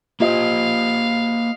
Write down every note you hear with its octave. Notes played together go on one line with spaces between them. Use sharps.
A#3 F4 G4 C5 D#5 F5